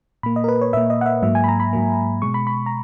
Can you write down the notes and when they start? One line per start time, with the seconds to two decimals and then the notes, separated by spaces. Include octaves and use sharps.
0.23 A#2 A#3 B5
0.36 D#5
0.44 A#4
0.48 B4
0.62 C#5
0.73 A#2 A#3 E5
0.90 D#5
1.01 F#5
1.06 E5
1.22 G#2 F#3 A#3 E5
1.35 G#5
1.44 B5
1.48 A#5
1.60 B5
1.73 G#2 F#3 A#3
2.22 B2 G#3 C#6
2.34 B5
2.47 B5
2.66 A#5